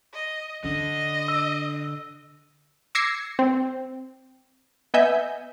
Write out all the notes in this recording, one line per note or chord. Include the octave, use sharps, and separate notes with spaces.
D#5
D3 D4 D#5
E6
D6 E6 G#6 A#6 C7 C#7
C4
B3 D#5 E5 G#5 G6